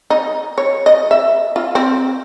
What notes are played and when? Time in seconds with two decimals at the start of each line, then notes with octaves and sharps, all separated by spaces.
0.10 D#4
0.58 C#5
0.86 D#5
1.11 E5
1.56 F4
1.75 C4